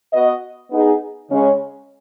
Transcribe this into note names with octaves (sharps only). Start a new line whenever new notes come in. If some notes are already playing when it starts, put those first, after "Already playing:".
B3 F#4 B4 D#5
B3 D#4 G#4
C#3 G#3 C#4